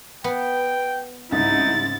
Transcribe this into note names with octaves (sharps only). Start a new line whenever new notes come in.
B3 G5
C2 G#2 C#3 D#4 E4 A6